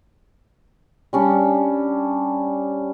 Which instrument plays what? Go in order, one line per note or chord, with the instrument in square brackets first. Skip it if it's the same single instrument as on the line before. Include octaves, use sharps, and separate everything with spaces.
[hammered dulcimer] G3 C#4 D4